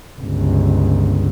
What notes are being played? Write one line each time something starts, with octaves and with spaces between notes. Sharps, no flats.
G1 C#2